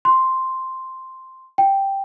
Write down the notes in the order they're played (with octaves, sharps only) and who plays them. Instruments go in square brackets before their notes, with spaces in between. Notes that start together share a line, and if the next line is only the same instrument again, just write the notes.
[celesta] C6
G5